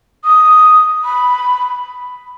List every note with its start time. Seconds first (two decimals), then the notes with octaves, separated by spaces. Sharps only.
0.24 D#6
1.04 B5